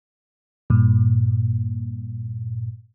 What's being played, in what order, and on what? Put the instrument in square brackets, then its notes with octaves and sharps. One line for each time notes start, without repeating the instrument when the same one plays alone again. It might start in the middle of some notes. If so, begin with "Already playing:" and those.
[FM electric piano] G2 A#2